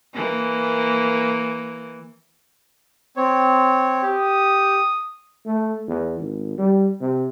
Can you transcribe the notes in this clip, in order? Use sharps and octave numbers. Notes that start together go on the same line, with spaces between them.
E3 A#3
C4 C#5
G4 D#6
A3
E2
G#1
G3
C3